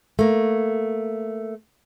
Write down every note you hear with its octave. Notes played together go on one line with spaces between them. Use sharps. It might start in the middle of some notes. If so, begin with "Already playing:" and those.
A3 A#3